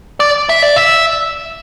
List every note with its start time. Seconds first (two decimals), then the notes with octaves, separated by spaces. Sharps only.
0.20 D5
0.49 E5
0.62 D5
0.76 E5